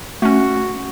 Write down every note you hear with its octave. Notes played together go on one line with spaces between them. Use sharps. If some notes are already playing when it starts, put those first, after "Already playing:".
A3 C#4 F#4